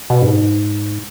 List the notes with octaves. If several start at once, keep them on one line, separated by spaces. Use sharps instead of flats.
B2
G2
G#2